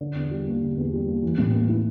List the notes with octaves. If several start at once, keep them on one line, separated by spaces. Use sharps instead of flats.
D3
E2
G3
A#3
D3
E2
G3
A#3
E3
A2
A#3
E4